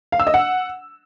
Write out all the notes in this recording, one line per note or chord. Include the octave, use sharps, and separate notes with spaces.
F5
E6
D#5
F#5